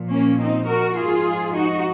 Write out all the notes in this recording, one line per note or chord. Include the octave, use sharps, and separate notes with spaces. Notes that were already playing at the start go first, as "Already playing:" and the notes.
Already playing: A#2 F3
A#3 C#4
C4 D#4
F#4 A#4
G#2 F3 F4 G#4
D#4 F#4